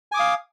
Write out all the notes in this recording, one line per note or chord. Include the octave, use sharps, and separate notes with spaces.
F5 G#5 D6 D#6